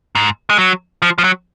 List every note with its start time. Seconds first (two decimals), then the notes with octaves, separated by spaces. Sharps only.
0.15 G#2
0.50 G#3
0.59 F#3
1.02 F3
1.18 F3
1.24 F#3